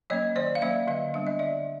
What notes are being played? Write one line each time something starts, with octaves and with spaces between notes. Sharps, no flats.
F#3 A#3 C#4 C#5 D#5
D#3 C5 D5
F5
F#3 A#3 C#4 D5 E5
D3 D#5 F5
G3 B3 D4 E5
D#5
D3 D5 E5